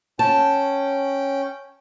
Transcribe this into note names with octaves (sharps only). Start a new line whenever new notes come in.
C#4 G5 A5